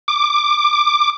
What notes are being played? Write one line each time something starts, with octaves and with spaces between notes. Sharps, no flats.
D6